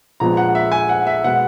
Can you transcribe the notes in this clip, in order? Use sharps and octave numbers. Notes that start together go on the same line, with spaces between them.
A#1 A#2 G#3 B3 A#5
F#5
E5
G#5
F#5
E5
B2 G#3 B3 F#5